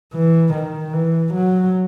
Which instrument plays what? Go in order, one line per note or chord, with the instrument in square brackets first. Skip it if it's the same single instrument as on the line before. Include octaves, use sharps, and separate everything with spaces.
[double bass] E3
D#3
E3
F#3